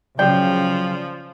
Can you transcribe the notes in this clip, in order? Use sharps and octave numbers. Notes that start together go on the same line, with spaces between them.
C#3 F3 F#3 D5 G5